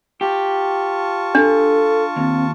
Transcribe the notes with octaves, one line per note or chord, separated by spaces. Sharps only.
F4 G4 A5 C#6
D4 A4
D#2 C4